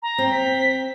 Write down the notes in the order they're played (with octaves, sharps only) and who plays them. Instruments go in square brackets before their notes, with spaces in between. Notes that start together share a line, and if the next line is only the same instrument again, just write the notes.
[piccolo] A#5
[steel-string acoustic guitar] C4
[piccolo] B6